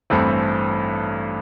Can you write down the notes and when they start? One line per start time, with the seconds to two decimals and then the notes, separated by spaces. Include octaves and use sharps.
0.10 A1 G2 E3 A3 C4 A4